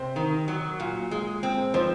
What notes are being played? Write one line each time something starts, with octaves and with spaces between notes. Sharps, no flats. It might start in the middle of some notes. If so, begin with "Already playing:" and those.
Already playing: C3 C5
D#3
F#3
A#2
G#3
C4
F3 C5